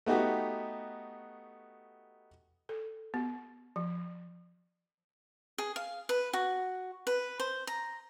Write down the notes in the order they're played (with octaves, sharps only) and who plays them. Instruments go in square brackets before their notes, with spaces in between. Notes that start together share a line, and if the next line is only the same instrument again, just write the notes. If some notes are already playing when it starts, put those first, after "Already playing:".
[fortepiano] A3 B3 D#4 F#4 G4
[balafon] A4
B3
F3
[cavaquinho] G#4
F5
B4
F#4
B4
C5
A#5